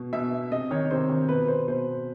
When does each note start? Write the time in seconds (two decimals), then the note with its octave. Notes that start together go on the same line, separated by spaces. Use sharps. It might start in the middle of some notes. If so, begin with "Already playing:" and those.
Already playing: B2
0.13 B2 E5
0.51 C3 D#5
0.71 D#3 C#5
0.91 C3 C5
1.09 D#3
1.29 B2 B4
1.48 C5
1.68 B2 C5